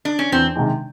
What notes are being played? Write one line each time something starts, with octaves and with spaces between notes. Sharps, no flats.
D4
C#4
E2 C4
C3 D#3 G#3